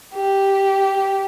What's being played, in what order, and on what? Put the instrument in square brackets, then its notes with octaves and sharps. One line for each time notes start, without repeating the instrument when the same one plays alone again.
[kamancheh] G4